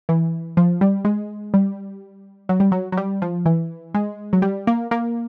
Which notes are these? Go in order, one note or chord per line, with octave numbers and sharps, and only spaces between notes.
E3
F3
G3
G#3
G3
F#3
G3
F#3
F#3
G3
F3
E3
G#3
F#3
G3
A#3
A#3